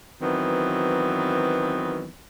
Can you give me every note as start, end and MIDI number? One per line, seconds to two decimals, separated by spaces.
0.22 2.09 51
0.22 2.09 52
0.22 2.09 54
0.22 2.09 59
0.22 2.09 60